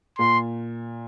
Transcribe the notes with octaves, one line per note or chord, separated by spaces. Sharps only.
A#2 C6